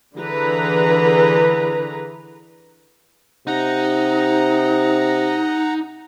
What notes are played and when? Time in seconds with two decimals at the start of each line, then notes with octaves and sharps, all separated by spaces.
0.17 D3 E3 G#4 B4 A#5
3.47 C3 D#4 F#5 A#5